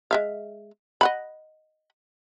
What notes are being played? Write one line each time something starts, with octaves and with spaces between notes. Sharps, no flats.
G#3 E5 F5
D#5 F#5 B5